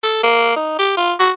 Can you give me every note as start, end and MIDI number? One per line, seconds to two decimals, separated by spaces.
0.03 0.19 69
0.23 0.55 58
0.56 0.75 63
0.79 0.93 67
0.97 1.14 65
1.20 1.32 66